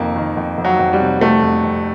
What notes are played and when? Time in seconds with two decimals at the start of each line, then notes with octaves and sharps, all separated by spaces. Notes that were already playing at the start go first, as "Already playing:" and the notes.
Already playing: F2 C3 D#3 A#3
0.16 D#3
0.37 F2
0.58 F2
0.65 F#3
0.79 F2
0.93 G3
1.00 C3
1.21 C3 A3
1.42 F2
1.64 F2